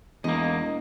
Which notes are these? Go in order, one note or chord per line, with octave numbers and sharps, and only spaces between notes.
E1 E2 A#3 D#5